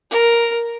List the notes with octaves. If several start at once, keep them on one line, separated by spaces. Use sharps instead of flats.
A#4